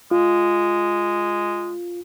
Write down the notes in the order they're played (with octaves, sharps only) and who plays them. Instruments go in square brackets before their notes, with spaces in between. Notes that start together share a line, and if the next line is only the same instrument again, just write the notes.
[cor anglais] G#3 [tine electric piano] F4